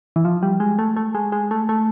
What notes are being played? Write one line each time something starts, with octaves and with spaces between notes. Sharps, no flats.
E3
F3
G3
G#3
A3
A3
G#3
G#3
A3
A3